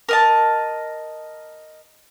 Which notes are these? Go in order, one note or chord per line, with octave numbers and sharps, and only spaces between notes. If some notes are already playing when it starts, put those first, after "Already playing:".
A#4 D#5 A5